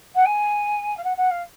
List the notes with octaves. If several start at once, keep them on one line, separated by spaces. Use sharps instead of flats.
F#5
G#5
F5
F#5
F#5
F5